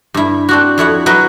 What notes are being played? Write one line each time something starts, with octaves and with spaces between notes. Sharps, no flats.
G2 E4
C4 D4 F#4
F2 E4 C#5 F#5
F#3 E4 B4 D#5